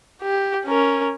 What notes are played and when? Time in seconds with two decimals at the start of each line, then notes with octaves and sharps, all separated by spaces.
0.22 G4
0.66 C#4 A#4